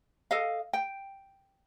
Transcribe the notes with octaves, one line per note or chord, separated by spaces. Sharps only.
A4 D#5 F5
G5